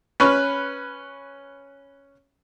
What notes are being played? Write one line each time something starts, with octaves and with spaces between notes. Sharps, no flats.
C#4 B4 C#6 F6